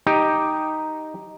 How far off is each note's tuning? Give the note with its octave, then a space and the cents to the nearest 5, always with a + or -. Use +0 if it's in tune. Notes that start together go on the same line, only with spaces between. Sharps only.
D#4 +0 G4 +0